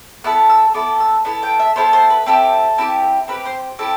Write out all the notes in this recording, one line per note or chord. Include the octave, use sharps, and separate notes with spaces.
B3 E4 A4 F#6
E6
B3 E4 A4 D6
E6
B3 E4 A4 A5
G5
E5
B3 E4 A4 C5
C5
B4
C4 E4 G4 A4
C4 E4 G4
C4 E4 G4 B4
C5
C4 E4 G4 A4